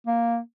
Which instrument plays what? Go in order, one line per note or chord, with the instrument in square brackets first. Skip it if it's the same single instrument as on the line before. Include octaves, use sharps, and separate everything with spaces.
[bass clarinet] A#3